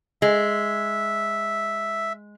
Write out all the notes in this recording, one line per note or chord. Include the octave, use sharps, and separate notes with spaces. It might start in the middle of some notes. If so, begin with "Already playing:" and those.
G#3 E5